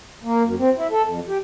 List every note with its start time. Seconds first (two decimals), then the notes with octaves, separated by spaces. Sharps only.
0.23 A#3
0.43 F#2
0.59 C4
0.77 E4
0.91 A4
1.05 F2
1.28 G4